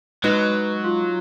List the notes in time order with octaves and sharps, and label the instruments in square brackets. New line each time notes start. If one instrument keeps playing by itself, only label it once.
[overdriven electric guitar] F#3 [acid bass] G#3 [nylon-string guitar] D#4 [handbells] B4
[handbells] F4